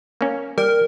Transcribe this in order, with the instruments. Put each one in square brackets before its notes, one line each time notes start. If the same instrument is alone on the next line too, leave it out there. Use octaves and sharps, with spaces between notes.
[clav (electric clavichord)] A#3 C#4
[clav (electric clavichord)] G3 [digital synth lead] A#4